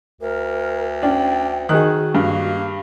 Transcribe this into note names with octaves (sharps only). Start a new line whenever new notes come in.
D2 A#4
C#4 D4 G5
D#3 F#4 G#4 F#6
G2 A#3